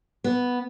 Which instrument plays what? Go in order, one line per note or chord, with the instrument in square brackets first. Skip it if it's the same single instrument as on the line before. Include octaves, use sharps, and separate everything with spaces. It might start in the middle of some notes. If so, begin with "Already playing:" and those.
[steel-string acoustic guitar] B3